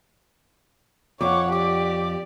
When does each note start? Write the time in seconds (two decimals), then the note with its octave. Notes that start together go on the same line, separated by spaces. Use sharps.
1.21 F2 C#5 F#5 D6
1.52 G4 D5 D6